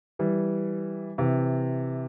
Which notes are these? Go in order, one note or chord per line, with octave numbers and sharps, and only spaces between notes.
E3 G3
C3 E3